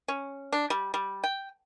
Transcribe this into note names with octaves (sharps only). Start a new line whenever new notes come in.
C#4
D4
G3
G3
G5